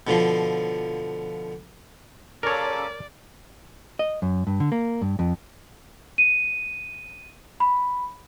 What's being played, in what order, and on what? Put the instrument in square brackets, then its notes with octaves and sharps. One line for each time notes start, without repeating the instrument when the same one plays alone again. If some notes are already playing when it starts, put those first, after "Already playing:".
[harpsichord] B2 D3 F3 C6
[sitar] A#2 C#3 [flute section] C#4 A4 D6 [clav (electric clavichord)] A#4 C#5 [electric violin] D5
[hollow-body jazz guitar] D#5
F#2
G2
D3
A#3
G2
F2
[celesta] D#7
B5